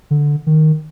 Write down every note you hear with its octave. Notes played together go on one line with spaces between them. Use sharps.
D3
D#3